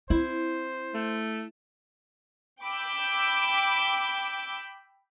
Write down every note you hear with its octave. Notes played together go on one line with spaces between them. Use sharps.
C4 E4 C5
A3
G5 B5 D6 E6 G6